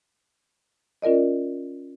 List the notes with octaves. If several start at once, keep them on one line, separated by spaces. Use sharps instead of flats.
C#4 F4 A#4 D5 D#5